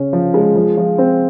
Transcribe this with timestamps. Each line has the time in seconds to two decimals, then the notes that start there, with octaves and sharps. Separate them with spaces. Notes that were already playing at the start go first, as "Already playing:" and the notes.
Already playing: C#3 C#4
0.13 F3
0.34 G#3
0.55 F3
0.77 F3
0.98 C4